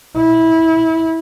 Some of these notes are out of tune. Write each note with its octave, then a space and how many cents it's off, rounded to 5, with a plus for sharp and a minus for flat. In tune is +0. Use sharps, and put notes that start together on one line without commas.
E4 -20